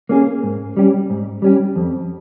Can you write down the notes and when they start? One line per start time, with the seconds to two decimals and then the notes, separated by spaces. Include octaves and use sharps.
0.09 A#3 C#4 G#4
0.43 G#2
0.77 G3 C#4 G4
1.10 G#2
1.42 G3 C#4 G4
1.76 F2